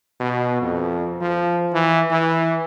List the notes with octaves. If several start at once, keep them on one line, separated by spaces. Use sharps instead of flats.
B2
F2
F3
E3
E3